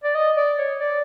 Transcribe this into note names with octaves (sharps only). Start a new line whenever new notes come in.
D5
D#5
D5
C#5
D5